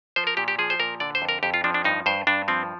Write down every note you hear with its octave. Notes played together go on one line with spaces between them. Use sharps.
F3 C5
A#4
A#2 G4
G4
F3 G#4
C5
A#2 A#4
D3 D5
C5
F2
A#4
F2 G4
F4
F3 D4
D4
G2 D#4
G2 C5
G2 D4
F3 C4